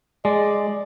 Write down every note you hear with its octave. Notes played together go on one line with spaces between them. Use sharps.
G#3 D5